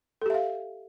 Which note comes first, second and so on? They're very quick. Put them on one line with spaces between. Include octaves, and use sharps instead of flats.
A4 G4 E5 F5